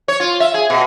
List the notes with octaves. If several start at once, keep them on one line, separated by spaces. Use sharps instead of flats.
C#5
F4
E5
G#4
B2